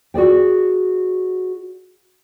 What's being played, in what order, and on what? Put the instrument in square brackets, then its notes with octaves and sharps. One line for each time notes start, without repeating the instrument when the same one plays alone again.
[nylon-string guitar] F#4 G#4 D5 G5